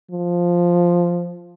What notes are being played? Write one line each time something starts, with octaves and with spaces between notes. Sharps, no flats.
F3